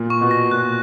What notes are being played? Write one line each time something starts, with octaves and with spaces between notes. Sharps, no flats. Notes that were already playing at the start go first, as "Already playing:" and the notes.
Already playing: A#2
C#6
B2
A#6
A#2 F#6